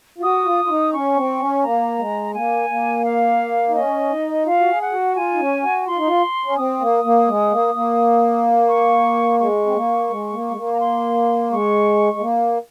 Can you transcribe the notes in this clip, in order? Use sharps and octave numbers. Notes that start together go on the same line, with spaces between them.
F4
F#4 D#6
F4
F4
D#4
C#4 C#6
C4
C#4
A#3 A#5
G#3
A#3 G#5
A#3
F5
D#4
C#4 D#5
D#4
F4 F5
F#4
G#4
F#5
F#4
F4 G#5
D#4
C#4
F#4
F4 C6
D#4
F4
C#4
C4 D#6
A#3
A#3
G#3
A#3
A#3
C#6
G#3 C#6
C4
A#3
G#3
A#3
G#3
A#3
A#5
C6
G#3 C#6
G#3
A#3